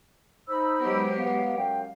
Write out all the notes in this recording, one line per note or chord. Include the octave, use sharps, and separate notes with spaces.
D#4 C5 B5 E6
F#3 G#3 B3 G4
B3 F5
F#2 F5 G5